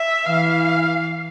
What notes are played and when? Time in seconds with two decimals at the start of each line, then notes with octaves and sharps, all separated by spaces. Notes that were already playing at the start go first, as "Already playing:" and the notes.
Already playing: E5
0.26 E3 F5